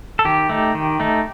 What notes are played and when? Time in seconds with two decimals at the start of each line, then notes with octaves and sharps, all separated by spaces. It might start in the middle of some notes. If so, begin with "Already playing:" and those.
0.19 A4
0.25 D#3 G4
0.49 A3 D#4
0.75 D#3
1.00 A3 D#4